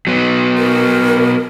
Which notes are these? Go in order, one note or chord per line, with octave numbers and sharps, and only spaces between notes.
F#3 B3
A#4